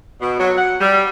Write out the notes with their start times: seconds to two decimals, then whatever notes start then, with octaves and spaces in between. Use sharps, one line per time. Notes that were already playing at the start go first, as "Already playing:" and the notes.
0.21 B2
0.39 F#3
0.57 F#5
0.81 G3